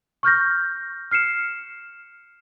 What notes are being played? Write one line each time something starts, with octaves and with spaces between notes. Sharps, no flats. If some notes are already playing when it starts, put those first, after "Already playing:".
C#6 F6 G6 A#6
F6 C7 C#7 E7